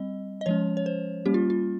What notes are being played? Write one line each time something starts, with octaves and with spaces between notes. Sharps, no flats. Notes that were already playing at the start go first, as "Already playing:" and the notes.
Already playing: G3 C4 D#5
D#5
F3 G#3 C#4 C#5
C#5
C5
G3 A#3 C#4 G4
F4
F4